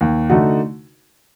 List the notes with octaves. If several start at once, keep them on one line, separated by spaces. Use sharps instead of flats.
D#2
D3 A3 D#4 F#4